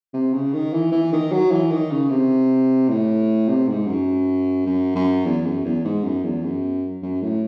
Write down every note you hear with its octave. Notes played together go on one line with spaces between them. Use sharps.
C3
C#3
D#3
E3
E3
D#3
F#3
E3
D#3
C#3
C3
A2
C3
G#2
F#2
F#2
F#2
E2
F#2
E2
G#2
F#2
E2
F#2
F#2
A2